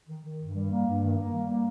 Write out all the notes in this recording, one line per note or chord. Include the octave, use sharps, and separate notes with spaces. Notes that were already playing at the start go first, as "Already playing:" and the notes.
D#3
D#3
G2
G3
A#3
G2
D#3
A#3
G3
A#3